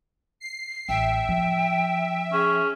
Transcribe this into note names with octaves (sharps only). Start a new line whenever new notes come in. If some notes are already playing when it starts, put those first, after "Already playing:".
C7
A1 E5 G5
F3
C#4 G#4